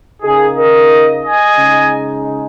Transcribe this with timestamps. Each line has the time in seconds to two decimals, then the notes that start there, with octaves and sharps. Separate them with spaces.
0.23 C#3 A#3 D#4 G#4
0.56 A#4 D#5
1.24 D#5 G#5
1.59 C#3 G#3 D#4